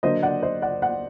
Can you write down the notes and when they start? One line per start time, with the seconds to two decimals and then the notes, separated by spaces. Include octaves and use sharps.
0.03 D3 F#3 A#3 D4 C5 D#5
0.23 D5 F#5
0.42 C5 D#5
0.62 D5 F#5
0.82 D5 F#5